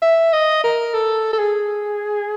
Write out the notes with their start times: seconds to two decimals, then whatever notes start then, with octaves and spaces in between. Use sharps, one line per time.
0.02 E5
0.33 D#5
0.64 A#4
0.94 A4
1.33 A4
1.39 G#4